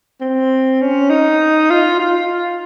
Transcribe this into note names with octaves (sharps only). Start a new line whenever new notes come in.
C4
C#4
D#4
F4
F4